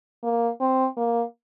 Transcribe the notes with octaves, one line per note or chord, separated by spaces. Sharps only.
A#3
C4
A#3